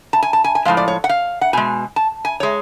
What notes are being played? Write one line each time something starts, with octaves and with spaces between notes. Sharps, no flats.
A5
G#5
A5
G#5
G#5
A2 F3 G#3 F5
D5
C#5
F#5
F5
F#5
B2 G#3 G#5
A5
G#5
G#3 C#5